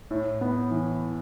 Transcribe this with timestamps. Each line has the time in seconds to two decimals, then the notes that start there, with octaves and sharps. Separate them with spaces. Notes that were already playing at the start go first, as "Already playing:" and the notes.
0.11 A2
0.41 B3
0.71 E3